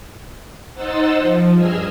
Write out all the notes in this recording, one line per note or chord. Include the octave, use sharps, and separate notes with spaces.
D#4 C5 D#5 F#5 E6 A6
F3
G2 G#4 D#5 G#5 E6 F6